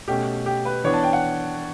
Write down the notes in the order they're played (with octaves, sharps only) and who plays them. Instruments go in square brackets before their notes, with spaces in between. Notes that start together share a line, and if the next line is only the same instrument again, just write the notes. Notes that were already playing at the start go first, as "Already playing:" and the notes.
[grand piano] B2 A3 C#4 G4
G4
B4
E3 B3 D4 C#5
A5
G5
F#5